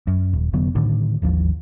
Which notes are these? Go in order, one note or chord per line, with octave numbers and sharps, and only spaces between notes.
F#2
D#1
F1 D3 F#3 B3
A2 D3 D#3
G#1 D#2 F3